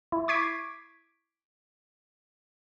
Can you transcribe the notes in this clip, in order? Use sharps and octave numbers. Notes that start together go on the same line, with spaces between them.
E4
C#6 D6 G#6 B6 C7 D7